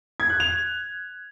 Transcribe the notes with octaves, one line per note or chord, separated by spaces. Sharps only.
G#6
F#6
F7